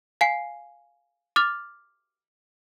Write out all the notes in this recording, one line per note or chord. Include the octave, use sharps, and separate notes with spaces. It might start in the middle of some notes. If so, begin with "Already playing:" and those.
F5 G#5 C7
D6 F6 A6 F7